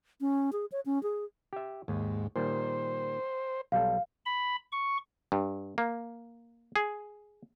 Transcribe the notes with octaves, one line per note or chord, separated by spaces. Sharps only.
C#4
G#4
C#5
C#4
G#4
G4 E5
D#2 G#2
A#2 D#3 G3 C5
B1 G3 A4 F5
B5
C#6
G2
A#3
G#4